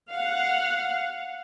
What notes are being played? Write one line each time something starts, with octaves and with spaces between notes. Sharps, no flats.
F5 F#5